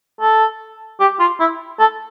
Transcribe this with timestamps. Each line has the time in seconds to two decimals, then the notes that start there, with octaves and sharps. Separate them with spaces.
0.21 A4
1.00 G4
1.20 F4
1.40 E4
1.79 A4